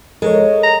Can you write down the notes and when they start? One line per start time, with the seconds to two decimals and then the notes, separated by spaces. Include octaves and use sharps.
0.22 G#3 A4 A#4 C#5
0.63 A#5